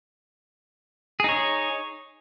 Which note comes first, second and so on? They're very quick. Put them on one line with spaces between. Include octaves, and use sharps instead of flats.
G#4 D#4 C#5